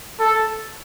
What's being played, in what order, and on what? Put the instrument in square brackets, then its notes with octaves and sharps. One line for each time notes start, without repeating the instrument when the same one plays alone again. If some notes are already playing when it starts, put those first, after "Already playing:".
[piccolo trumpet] A4